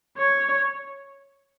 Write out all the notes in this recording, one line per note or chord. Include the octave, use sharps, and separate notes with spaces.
C#5